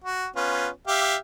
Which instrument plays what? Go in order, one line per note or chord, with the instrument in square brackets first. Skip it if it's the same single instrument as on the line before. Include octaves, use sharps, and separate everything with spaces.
[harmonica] F#4
B3 C#4 F4
G4 E5 F5